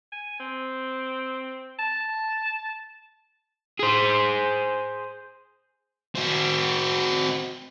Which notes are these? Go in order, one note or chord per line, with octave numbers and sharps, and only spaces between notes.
G#5
C4
A5
G#4 C5
C4 F#4